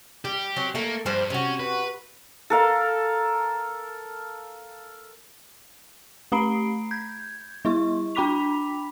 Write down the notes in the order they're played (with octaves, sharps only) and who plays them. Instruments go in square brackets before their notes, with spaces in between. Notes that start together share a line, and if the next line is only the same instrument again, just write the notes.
[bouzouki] G3 [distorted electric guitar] G4
[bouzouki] F#3 C4 C#4
[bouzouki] A3 A4 [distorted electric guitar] A#3
[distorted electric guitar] G2 [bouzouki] F3 G3 C5
[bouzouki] C3 F#4 [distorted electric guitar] C#4
[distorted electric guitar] B4
[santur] A4 A#4 F5
[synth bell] A3 G4 A#5 B5 C7 D7
G6 G#6
G3 E4 C#6
D4 G5 B5 D6 B6 F7